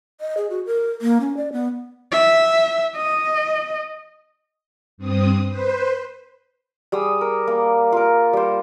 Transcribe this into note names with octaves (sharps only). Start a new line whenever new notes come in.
D#5
G#4
F#4
A#4
A#3
C#4
D5
B3
E5
D#5
G2 C4 D#6
B4 C5
G3 G#4 D#6 E6
A#4
A#3
F4 A#4
G3 C5